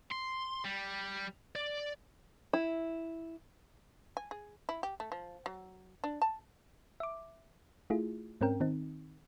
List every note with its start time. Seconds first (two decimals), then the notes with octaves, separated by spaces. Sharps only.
0.11 C6
0.65 G3
1.56 D5
2.53 E4
4.17 G#5
4.31 G#4
4.69 E4
4.83 G4
5.00 A3
5.12 F3
5.46 F#3
6.04 D4
6.22 A5
7.00 E5 D6
7.90 A3 E4 F4 G#4
8.41 G#2 C4 C#4 A#4 G5
8.60 D#3 C4 D#4